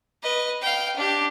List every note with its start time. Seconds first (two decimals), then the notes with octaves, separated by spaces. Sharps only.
0.23 B4 D#5
0.61 F5 G5
0.96 D4 G4